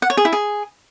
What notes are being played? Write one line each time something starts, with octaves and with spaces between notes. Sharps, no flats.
F#5
C#5
G#4
E4
G#4